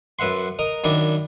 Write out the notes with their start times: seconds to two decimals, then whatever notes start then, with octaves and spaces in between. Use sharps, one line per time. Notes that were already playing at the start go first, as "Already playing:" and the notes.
0.19 F#2 B4 E5 F#5 C6
0.59 A#4 D#5 A#5
0.84 F#2 D#3 D4 E4